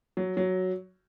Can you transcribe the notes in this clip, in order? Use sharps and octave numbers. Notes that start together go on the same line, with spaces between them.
F#3
F#3